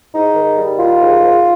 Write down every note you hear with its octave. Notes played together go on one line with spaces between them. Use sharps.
G#2 D#4
D#3
G3
D#3 F4
G#2
G#2